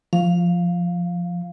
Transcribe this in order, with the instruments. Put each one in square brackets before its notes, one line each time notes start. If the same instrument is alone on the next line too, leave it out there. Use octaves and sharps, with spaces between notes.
[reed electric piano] F3 [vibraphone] F5